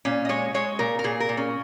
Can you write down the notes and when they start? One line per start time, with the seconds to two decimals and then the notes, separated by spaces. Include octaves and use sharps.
0.05 A#2 C#4
0.25 D#5
0.29 G#3 C#5
0.54 G#3 C#5
0.79 A#2 A#4
0.99 A#4
1.04 A#2 G#4
1.20 A#4
1.29 A#2
1.37 C#4